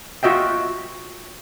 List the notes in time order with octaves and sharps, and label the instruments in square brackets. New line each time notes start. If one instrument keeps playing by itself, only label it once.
[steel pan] F4 F#4 D#5 E5 G5